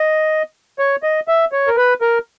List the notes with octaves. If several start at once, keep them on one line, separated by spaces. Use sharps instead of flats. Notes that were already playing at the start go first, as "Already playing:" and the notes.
Already playing: D#5
C#5
D#5
E5
C#5
A#4
B4
A#4